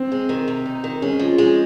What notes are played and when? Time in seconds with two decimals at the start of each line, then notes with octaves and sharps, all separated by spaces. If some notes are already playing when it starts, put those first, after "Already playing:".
Already playing: C4
0.12 G#3
0.29 D#3
0.48 C3
0.66 D#4
0.84 D#3
1.02 G#3 C#4
1.19 F3
1.38 G#3